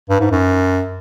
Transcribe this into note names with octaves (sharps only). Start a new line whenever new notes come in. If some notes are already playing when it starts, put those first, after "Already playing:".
G2
G#2
F#2